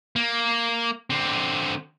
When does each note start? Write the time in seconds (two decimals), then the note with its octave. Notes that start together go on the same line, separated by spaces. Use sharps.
0.16 A#3
1.10 D3 C4